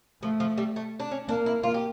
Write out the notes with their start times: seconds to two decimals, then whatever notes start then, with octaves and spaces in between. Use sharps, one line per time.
0.22 F3 A3
0.40 F3
0.58 G3
0.76 A3
1.00 D4
1.11 C#4
1.28 A#3 D4
1.46 E4
1.63 F4
1.74 G4